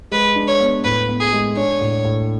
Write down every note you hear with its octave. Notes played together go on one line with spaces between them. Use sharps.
G#3 B4
D4
C#5
B3
A2 B4
B3
G#4
G#3
D4 C#5
A2
A2